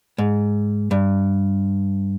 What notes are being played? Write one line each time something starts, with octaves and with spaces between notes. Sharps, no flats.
G#2
G2